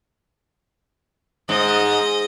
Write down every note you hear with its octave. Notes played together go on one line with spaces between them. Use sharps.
G#2 D#5